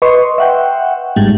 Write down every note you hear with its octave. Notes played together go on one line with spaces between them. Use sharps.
B4 D#5 C6 C#6
E5 F#5 G5
G#1 G#2 G3